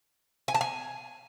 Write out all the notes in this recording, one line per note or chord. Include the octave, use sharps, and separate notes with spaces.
G#5
A5
G#5